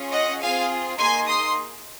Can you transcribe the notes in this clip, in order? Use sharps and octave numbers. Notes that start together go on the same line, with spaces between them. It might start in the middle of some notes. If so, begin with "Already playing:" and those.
Already playing: C#4 F4 G#4
D#5 F#5
C4 F4 G#4 F5 G#5
A#3 D#4 G#4 G#5 C6
C6 D#6